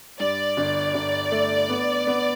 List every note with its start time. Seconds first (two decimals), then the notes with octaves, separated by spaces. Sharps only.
0.20 G2 D5
0.57 G1
0.94 G1
1.32 A3
1.69 B3
2.07 B3